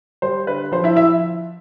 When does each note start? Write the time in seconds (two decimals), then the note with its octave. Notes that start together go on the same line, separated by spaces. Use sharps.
0.22 G3 C5
0.47 D3 B4
0.72 F3 C5
0.84 E4 E5
0.96 F3 E4 E5